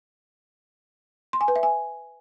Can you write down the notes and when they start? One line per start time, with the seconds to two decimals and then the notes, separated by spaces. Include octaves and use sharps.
1.33 C6
1.41 G#5
1.48 B4
1.56 E5
1.63 G#5